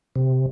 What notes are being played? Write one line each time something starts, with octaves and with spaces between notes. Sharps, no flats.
C3